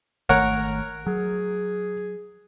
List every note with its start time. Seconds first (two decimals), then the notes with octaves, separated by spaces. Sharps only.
0.29 G#1 D#3 A3 A#4 C#5 F#5
1.07 F#3 G#4